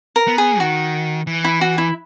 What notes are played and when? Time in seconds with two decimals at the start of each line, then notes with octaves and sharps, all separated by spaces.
0.16 A#4
0.27 B3
0.38 G#4
0.60 D#3 F#4
1.27 E3
1.44 E4
1.61 F#4
1.78 E4